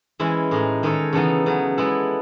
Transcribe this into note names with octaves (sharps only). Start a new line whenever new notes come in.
E3 G#3 C#4 E4
A2 G#3 D#4
D#3 G#3 D#4 A4 C#5
C#3 E3 B3 D#4 A4
C#3 F#3 B3
G#3 B3 E4 A4